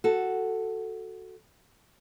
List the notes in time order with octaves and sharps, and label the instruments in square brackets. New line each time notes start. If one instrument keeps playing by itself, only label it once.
[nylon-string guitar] F#4 A4